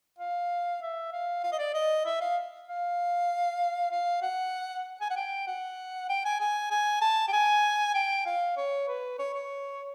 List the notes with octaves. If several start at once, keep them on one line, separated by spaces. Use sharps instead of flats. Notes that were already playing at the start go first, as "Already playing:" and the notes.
F5
E5
F5
F5
D#5
D5
D#5
E5
F5
F5
F5
F#5
G#5
F#5
G5
F#5
G5
G#5
G#5
G#5
A5
G5
G#5
G5
F5
C#5
B4
C#5
C#5